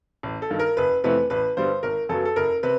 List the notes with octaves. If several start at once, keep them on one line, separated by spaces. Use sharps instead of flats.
A1
A4
G2 D#3
A#4
F#1 B4
F2 C3 E3 A3 B4
A1 B4
G2 D3 G3 B3 C5
G#1 A#4
F#2 C#3 F#3 B3 A4
A4
F#1 A#4
C3 B4